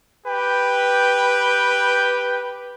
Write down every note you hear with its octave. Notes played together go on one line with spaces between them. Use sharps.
G4 B4 G5